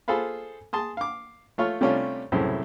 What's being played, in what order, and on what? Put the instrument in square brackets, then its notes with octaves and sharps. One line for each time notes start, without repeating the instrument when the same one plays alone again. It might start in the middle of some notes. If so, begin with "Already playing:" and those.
[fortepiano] F4 G#4 A4 C5 F5 B5
G#4 A5 C6 D#6
F5 D6
A3 F4 C#5 F6
C3 G3 A3 C#4 D4 F4
C2 F#2 A2 C#3 E4 C5